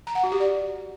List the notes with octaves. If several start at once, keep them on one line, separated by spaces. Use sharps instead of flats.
A#5
F#5
F#4
G4
D5